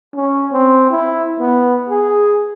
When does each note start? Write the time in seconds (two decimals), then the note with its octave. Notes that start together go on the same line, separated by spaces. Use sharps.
0.15 C#4
0.52 C4
0.90 E4
1.39 B3
1.90 G#4